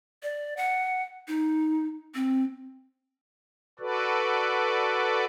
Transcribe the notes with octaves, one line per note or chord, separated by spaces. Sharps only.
D5
F#5
D#4
C4
F#4 A4 B4 D5